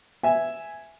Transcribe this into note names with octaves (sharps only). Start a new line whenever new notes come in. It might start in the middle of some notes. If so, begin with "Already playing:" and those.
E5 G#5